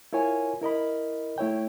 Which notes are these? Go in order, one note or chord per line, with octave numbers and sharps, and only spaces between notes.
E4 F4 A#4 C#5 G#5
E4 A#4 D#5 B5
A3 E4 C#5 G5